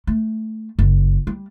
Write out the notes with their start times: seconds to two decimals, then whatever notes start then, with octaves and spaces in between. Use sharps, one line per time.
0.07 A3
0.79 F#1
1.27 G3